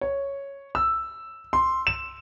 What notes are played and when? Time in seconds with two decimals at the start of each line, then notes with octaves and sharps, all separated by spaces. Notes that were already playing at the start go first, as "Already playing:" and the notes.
0.01 C#5
0.75 E6
1.53 C6
1.87 E7